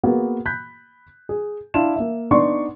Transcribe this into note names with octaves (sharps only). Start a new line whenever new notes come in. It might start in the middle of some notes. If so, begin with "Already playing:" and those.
A#3 B3 F#4 G#4
B5 F#6 G6 B6
G#4
D4 E4 F5 A5 C6 E7
A#3 E5
B3 D4 D#4 D5 C6 C#6